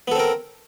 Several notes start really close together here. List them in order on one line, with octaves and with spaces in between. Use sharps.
B3 A4 C4 A#4